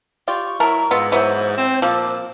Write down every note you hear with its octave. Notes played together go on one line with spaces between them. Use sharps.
F4 G4 D5 C#6
F#3 E4 A#4 A5
G#2 B3 F4 A4 D#5
E3 F#3 B3 C5 E5
C4
A#2 F3 A4 D6